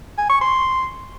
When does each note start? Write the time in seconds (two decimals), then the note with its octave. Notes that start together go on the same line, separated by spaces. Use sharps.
0.18 G#5
0.30 C#6
0.41 C6